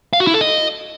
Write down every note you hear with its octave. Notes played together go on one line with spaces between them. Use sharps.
F5
F#4
E4
A4
D#5